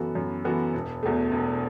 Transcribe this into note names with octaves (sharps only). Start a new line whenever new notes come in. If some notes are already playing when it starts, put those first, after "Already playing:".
Already playing: F#2 E3 B3 F#4 A4
F#2
E3 B3 F#4 A4
E1
E2 B2 A3
E1